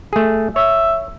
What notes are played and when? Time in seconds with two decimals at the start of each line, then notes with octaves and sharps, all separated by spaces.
0.13 A3 G#4
0.56 C#5 E5